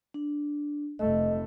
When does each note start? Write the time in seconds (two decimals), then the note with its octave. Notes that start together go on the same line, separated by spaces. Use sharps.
0.14 D4
0.99 F1 A3 D#5